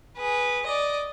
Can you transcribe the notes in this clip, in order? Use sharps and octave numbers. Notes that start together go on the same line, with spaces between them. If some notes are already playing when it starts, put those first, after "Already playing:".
G#4 B4
D5 D#5